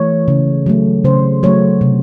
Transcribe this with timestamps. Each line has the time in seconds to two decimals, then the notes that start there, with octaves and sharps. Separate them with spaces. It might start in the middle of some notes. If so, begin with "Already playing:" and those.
Already playing: E3 A3 C#5
0.28 C#3
0.66 F#3 A3
1.04 C#3 C5
1.43 F#3 A3 C#5
1.81 C3